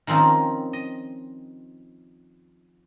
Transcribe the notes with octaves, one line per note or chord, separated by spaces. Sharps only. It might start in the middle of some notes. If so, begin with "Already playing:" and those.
D#3 F3 C4 C#4 D#4
D#5